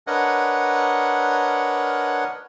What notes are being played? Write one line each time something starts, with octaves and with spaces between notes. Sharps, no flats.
D4 A#4 B4 C#5 D#5 F#5